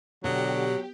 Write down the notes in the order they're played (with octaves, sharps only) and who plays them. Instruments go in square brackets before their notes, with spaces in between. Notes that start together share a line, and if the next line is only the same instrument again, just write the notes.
[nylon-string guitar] B2 [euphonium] D3 [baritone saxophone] F#3 [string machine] G4